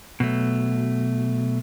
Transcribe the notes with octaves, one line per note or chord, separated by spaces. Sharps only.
B2 F#3 A3